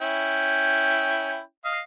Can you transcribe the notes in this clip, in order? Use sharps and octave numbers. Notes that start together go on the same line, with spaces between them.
C#4 E4 G5
D#5 F5